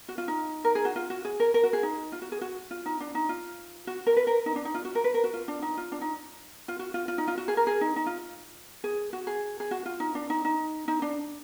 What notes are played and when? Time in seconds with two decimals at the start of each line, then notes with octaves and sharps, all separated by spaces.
0.09 F#4
0.18 F4
0.28 D#4
0.65 A#4
0.75 G#4
0.85 F#4
0.96 F4
1.10 F#4
1.25 G#4
1.40 A#4
1.54 A#4
1.63 F#4
1.73 G#4
1.83 D#4
2.12 F4
2.22 F#4
2.32 G#4
2.41 F#4
2.71 F4
2.86 D#4
3.00 D4
3.15 D#4
3.29 F4
3.87 F#4
4.07 A#4
4.17 B4
4.27 A#4
4.46 D#4
4.56 D4
4.65 D#4
4.75 F4
4.85 F#4
4.95 A#4
5.04 B4
5.14 A#4
5.24 F#4
5.34 F4
5.48 D4
5.62 D#4
5.77 F4
5.92 D4
6.01 D#4
6.68 F4
6.79 F#4
6.94 F4
7.08 F4
7.18 D#4
7.28 F4
7.38 F#4
7.48 G#4
7.57 A#4
7.67 G#4
7.81 D#4
7.96 D#4
8.06 F4
8.84 G#4
9.13 F#4
9.27 G#4
9.60 G#4
9.71 F#4
9.86 F4
10.00 D#4
10.15 D4
10.30 D#4
10.45 D#4
10.88 D#4
11.02 D4